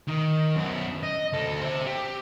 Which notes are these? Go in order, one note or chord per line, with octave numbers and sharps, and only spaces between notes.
D#3
F#2 B3
D#5
D2 A4
C5 E5
G4